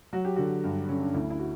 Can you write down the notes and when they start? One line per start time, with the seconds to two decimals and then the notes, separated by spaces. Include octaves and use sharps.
0.13 F#3 F#4
0.25 G4
0.36 D3 F#4
0.64 G2
0.89 D3 C#4
1.01 D4
1.14 D2 E4
1.30 E4
1.39 F#4